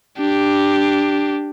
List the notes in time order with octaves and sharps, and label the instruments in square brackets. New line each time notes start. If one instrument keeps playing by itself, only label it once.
[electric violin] D4 G4